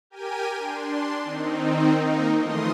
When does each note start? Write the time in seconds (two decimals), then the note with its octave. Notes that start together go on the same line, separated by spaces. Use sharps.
0.10 G4 A#4 G5 G#5 D#7
0.57 D4 C6
1.23 D#3 C4 D#4
2.03 A#3 D#4 A#4
2.38 E3 F3 A3 D#5 C6 D#6